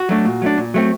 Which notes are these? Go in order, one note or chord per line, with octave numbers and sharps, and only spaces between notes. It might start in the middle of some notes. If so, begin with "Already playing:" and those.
Already playing: F#4
F#3 A3 D4
A#2
F#3 A3 D4
A#2
F#3 A3 C4